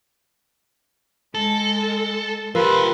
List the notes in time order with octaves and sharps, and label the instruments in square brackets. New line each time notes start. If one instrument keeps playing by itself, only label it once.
[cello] G#3 [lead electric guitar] A4
[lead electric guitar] F3 G4 [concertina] F4 B4 [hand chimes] A#4